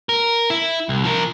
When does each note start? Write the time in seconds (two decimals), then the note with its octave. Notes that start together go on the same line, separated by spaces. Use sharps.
0.09 A#4
0.50 E4
0.89 C2
1.04 F3 A#4